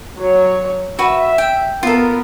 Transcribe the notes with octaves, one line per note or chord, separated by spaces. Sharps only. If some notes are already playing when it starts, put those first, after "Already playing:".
F#3 C#5
F#4 B4 E5
G5
B3 F4 A4 A#4